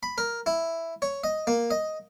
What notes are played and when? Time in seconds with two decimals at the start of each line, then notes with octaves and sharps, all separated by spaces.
0.03 B5
0.18 A#4
0.46 E4
1.02 C#5
1.24 D#5
1.47 A#3
1.71 D#5